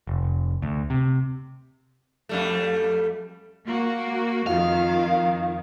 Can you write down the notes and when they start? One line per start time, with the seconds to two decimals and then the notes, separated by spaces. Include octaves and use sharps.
0.07 F1
0.62 D2
0.90 C3
2.29 F2 G3 A3
3.67 A#3 F#4
4.47 F2 D#3 F4 F5